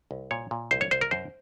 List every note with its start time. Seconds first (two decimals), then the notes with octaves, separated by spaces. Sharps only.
0.11 C2
0.31 A#2 C#5
0.51 A#2
0.71 C2 C5
0.81 C#5
0.91 C2 C5
1.01 A#4
1.11 F#2 C5